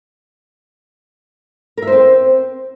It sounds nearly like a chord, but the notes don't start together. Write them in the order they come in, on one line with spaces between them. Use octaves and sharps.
A#4 E5 C5 C4